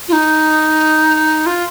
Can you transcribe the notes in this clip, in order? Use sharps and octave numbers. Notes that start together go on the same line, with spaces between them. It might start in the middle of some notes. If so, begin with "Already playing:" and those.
F4
D#4
F4